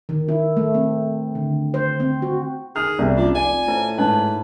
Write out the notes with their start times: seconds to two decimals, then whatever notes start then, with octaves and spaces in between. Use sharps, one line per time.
0.09 D#3
0.28 E4
0.57 A3
0.74 C4
1.35 D3
1.74 C5
2.00 C4
2.22 F#4
2.76 D#3 G#4 F6
2.99 C2 B2 D5
3.17 F#1 D4 F4
3.35 F1 D5 G#5
3.68 A2 E4 B4 C5
3.98 G#2 B4 D#5 F#5 A5